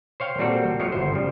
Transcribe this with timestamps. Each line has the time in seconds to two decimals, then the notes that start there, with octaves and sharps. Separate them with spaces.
0.20 C5 C#5 F5 G5
0.39 A#2 G3 C4 F#4 A4
0.80 F3 F#3 A3 C#5
0.92 G1 C5
1.12 C#3 F3 G3